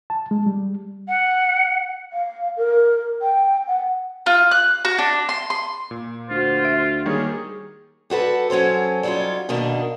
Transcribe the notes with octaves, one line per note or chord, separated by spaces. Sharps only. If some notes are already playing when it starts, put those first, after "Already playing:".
A5
G#3
G3
F#5
F5
A#4
G5
F#5
F4
F#6
F#4
D4
C6
C6
A#2
D2 F4 F#4 C5
E5 D7
D#3 G3 A#3 G#4 C#5
G3 F#4 A4 B4
F#3 C#4 A4 C5
F#3 G3 C#4 D#4 F4
G2 B2 D#3 A#3 D4 D#4